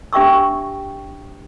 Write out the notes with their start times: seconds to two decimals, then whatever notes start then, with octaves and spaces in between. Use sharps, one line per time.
0.13 D4 G4 E5 G5 C#6 E6